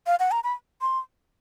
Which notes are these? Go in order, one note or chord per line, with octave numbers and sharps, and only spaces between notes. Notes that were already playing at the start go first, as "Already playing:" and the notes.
F5
F#5
A#5
B5
C6